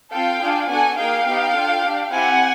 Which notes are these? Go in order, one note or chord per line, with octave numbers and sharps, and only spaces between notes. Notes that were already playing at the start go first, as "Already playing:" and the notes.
C4 F4 A4 F5 G5
D4 F4 G#4
B3 D4 F#4 A4 F#5 G#5
A#3 D#4 G#4 F5 G5
B3 D#4 G4
D4 F4 A4
D4 G4
C4 E4 G4 F#5 G#5